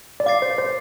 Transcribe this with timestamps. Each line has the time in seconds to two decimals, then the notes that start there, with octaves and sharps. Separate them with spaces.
0.20 D5
0.26 F5 D6 A6 C7
0.42 C5
0.58 C5